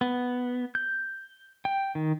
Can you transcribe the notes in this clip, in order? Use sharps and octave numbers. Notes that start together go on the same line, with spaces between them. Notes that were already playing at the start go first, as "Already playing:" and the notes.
B3
G6
G5
D#3